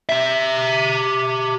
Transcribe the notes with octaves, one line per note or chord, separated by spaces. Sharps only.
G4 E5